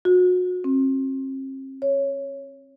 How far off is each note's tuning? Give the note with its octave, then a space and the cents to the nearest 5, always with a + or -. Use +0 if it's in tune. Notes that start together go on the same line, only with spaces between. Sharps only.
F#4 -30
C4 +40
C#5 +0